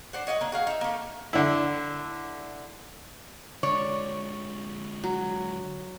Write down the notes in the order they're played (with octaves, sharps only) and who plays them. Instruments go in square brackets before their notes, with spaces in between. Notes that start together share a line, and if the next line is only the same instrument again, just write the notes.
[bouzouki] D4 C5 F#5
C#5 D#5 F5 F#5
A#3 D4
F#4 G#4 F5
D#4 E5
A3 A#3
[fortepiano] D3 E4
[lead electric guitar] D3 G#3 [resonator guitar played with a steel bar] C#5 [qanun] D5
[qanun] F#3